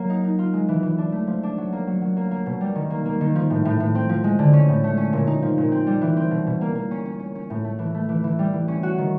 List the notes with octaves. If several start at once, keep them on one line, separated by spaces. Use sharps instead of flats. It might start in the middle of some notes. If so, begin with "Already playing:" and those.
Already playing: F#3 A#3
D#4
D#4
F4
G#3
E3
E3
D4
A3
F3
D4
F#3
A#3
F#3
F#3
A#3
A#3
B2
G3
D#3
A#3
A#3
D#3
F3
A2
A2
A2
C4
F3
G#3
D3
C#4
A2
A3
C#4
A#2
D#4
F3
A#2
C4
G3
E3
C4
B2
B2
A#3
A#3
C#4
C#4
C#4
C#4
A2
A3
E3
A3
E3
E3
G3
E3
C#4
F#4
D#3